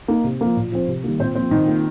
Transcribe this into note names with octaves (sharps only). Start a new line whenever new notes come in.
A#3 D#4
C3
F3 A#3
A#2
F3 C4
C3
D#3 G3 A#3
A#2 C4 C5
F3 A#3 C4
A#2 D#3 D#4
A#3 F4